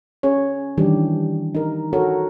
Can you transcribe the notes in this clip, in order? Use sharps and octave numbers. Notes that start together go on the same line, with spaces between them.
C#4 G#4 C#5
D#3 E3 G3 D4 G4
D#4 A#4
F#4 A4 A#4 C#5